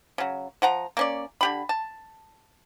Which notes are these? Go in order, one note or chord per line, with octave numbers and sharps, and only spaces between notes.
C#3 F#3
F3 F#5 A#5
A#3 C#4 D5
D3 G4 B5
A5